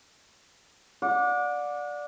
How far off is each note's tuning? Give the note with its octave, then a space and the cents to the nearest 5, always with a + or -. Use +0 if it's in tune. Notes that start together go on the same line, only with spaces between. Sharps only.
D5 +0 F#5 -35